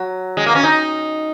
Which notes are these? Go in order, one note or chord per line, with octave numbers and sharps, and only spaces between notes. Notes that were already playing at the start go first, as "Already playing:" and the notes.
Already playing: F#3
G#3
A#3
C#4
D#4